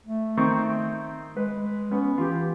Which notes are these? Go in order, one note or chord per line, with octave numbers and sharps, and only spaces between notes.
A3
D#3 C4 C#6
G#3 B4
B3 C#4
E3 F4 G4